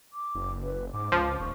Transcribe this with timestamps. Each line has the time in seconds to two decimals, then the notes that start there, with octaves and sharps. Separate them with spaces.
0.13 D6
0.35 F#1
0.63 B4
0.94 G#2 D6
1.12 C#2 F3
1.40 D#1 C#6